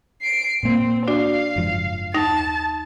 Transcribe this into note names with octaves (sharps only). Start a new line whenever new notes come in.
C7 D7
A#2 A#3 C4
D4 F#4 D5 F5
F#1 G#2 F3
D#2 D#4 A5 A#6